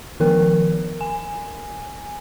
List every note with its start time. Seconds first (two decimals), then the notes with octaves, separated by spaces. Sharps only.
0.20 D#3 F3 B3 A#4
1.01 G#5